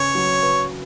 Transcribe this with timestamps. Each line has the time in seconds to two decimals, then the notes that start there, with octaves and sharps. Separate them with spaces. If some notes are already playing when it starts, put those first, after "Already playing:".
Already playing: C#3 C#4 B4 C#5
0.15 F#3
0.43 B4